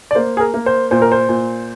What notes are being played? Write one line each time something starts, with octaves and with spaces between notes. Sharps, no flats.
D5
A#3 C5
G#4
A#4
A#3
C5
A#2 C5
A#4
C5
A#2